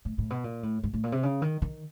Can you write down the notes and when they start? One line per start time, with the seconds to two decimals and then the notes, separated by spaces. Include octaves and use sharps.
0.05 A2
0.18 A2
0.30 B2
0.44 A#2
0.63 A2
0.83 G#2
0.93 A2
1.03 A#2
1.12 C3
1.23 C#3
1.42 D#3
1.62 D#3